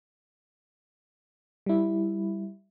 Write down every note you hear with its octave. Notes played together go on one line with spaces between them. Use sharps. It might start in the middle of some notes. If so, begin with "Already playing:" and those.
G3 E4